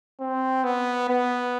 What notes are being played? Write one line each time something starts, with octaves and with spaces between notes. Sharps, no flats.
C4
B3
B3